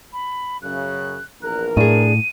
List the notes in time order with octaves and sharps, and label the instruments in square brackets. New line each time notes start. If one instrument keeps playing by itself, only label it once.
[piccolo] B5
[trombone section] F#2 C#3 [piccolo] F#6
[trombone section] A#1 E2 A#4 [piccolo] F#6
[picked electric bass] A2 [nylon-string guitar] D4 G#4 [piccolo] D#7